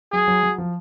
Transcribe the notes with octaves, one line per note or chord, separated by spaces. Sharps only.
F#3 G#4
F#3
F#3
F3